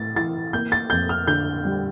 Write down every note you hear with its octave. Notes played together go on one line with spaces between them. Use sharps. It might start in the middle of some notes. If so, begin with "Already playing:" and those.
Already playing: A2 A6
E3 A6
A#3 G6
A6
F2 G6
F6
D3 G6
G3